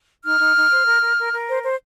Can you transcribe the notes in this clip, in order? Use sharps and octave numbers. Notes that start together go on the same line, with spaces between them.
D#4 F6
D#4
D#4
C5
A#4
A#4
A#4
A#4
C5
C5